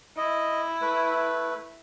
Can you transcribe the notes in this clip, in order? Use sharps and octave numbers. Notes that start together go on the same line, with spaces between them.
E4 D#5
A3 B4